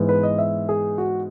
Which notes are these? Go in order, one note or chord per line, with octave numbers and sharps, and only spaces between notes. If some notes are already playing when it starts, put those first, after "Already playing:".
Already playing: G#2 E3 B3
B4
D#5
E5
G#4
F#4